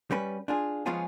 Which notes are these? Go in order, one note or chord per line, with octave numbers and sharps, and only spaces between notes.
G3 C#4 B4
D4 F4 G#4
F3 G#3 B3 C#4 F4 G#4